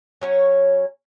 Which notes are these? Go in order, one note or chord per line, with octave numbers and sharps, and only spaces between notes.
F#3 C#4 C#5